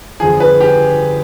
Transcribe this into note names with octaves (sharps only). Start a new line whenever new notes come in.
G1 F2 D3 F3 G#4
B4
G4